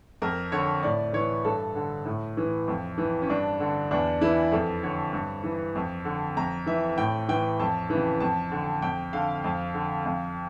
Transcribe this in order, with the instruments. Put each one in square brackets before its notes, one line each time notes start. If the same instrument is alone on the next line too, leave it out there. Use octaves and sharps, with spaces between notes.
[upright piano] F2 A#4
D3 C#5
A2 D5
E3 C#5
G2 A4
D3
A2
E3
F2
E3
C#4
G2 D4
D3
E2 D4
E3 E4
F2 A4
D3 C#5
G2
E3
F2
D3
F2 A#5
E3 E5
A2 G5
E3 G5
F2 A5
E3
C#3
F2 A5
D3
F2 G5
D3 F5
F2
D3
F2